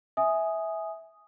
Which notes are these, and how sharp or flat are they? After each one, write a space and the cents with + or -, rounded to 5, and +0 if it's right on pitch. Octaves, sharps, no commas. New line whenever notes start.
E5 -15 G#5 +0 D#6 +0